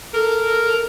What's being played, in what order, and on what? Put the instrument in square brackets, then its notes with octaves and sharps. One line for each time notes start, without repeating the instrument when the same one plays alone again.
[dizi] A4 [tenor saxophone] A#4